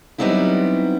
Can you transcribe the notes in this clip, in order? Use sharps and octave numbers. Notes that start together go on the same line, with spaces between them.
F#3 G3 B3 C4 D#4 E4